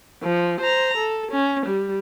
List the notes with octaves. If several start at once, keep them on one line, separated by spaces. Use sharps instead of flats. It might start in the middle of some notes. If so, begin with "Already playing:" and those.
F3
C5 A#5
A4
C#4
G3